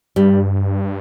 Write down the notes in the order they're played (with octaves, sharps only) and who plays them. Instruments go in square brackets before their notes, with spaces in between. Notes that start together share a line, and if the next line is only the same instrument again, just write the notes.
[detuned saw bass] G2 [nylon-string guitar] G3